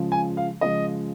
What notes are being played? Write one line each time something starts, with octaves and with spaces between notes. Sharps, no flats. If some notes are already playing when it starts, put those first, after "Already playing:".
Already playing: C#3 F3 G#3
G#5
F5
C#3 F3 G#3 D#5